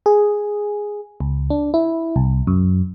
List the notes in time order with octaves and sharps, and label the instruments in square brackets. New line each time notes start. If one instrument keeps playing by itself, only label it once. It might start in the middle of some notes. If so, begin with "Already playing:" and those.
[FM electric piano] G#4
C#2
D4
E4
C2
F#2